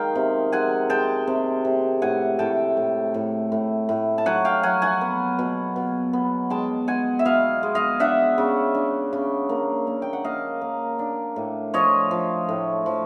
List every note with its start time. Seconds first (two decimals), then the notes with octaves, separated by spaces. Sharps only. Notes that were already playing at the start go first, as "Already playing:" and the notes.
Already playing: D#3 G#3 F5 G5
0.15 C3
0.52 G#3 F#5 G#5
0.90 G#3 G5 A5
1.27 C3
1.65 C3
2.02 A2 F#5 G#5
2.39 A2 G5 A5
2.77 A2
3.14 A2
3.52 A2
3.89 A2
4.18 A5
4.26 F#3 F#5 G#5
4.45 F5 G5
4.63 F#3 F#5 G#5
4.82 F#5 G#5
5.01 B3
5.39 B2
5.76 B2
6.13 B3
6.50 G#3 G5 A5
6.87 G#3 F#5 G#5
7.19 E5
7.25 B2 D#5 F5
7.63 G#3
7.75 D#5 F5
8.00 D4 E5 F#5
8.38 C#3
8.75 D4
9.13 C#3
9.49 A#3
9.87 A#3
10.02 G5
10.13 F#5
10.24 A#3 D#5 F5
10.61 A#3
10.99 D4
11.36 A2
11.74 F3 C#5 D#5
12.11 F3
12.49 A2
12.86 F3